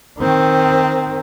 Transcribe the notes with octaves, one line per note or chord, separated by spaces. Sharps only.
D#3 C4